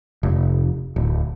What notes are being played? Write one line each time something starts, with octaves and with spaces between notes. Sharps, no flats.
F1
D1